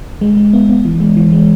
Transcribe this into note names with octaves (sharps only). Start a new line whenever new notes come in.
G#3
G#3
B3
B3
E3
G#3
E3
G#3